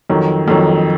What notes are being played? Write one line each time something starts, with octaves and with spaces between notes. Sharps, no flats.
F2 D#3 F#3
F2 D#3 F#3